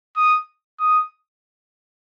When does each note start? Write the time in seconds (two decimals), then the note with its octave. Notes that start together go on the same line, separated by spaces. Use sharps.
0.16 D#6
0.80 D#6